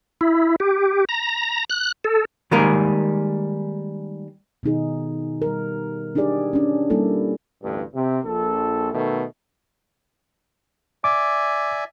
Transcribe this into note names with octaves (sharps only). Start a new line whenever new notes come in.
E4
G4
A#5
F#6
A4
D#3 G3 G#3 A#3 G#4 A#4
B2 D#3 D#4 G#4
G3 A#4
D4 D#4 G4 G#4 D5
C#4 D4
G3 A#3 E4 A4
A1 D2 G2
C3
A#1 A4
B2 D#3 A3
D5 E5 G#5 D6